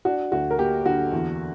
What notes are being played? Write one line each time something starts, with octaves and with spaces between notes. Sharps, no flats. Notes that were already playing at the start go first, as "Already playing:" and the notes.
D4 F#4
D2 F#4
A#4
A#3 G4
D3 F#4
E2